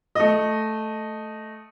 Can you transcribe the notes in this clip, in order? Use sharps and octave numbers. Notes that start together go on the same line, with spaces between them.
A3 D#5